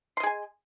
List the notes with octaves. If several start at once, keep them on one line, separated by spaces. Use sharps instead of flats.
G#4 D#5 G#5 C6